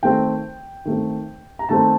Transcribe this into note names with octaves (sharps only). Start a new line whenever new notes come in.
D#3 A3 C4 G5
D#3 A3 C4
A#5
D#3 A3 C4 A5